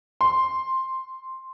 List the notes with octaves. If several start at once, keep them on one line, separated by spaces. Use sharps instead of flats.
C6